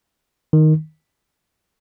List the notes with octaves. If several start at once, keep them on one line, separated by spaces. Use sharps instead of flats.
D#3